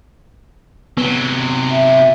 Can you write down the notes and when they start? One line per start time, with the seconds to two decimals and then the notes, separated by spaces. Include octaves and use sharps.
0.97 C3 F#3 B3
1.70 E5